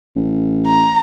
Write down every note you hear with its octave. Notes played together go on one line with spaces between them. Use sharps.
A1
A#5